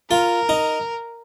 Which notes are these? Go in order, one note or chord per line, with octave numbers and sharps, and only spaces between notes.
F4 A#4
D#4